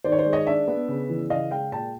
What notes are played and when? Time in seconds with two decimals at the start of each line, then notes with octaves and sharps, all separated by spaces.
0.04 D#3 C5 D5
0.12 C#5
0.18 C5 D5
0.26 G#3
0.33 C#5 D#5
0.46 D4 D5 E5
0.68 B3
0.88 C#3
1.10 E3
1.30 C#3 D#5 F5
1.51 G#3 F5 G5
1.72 A#2 G5 A5